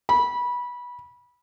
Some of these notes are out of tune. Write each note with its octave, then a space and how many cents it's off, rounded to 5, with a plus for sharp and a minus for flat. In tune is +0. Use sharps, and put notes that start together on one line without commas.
B5 -20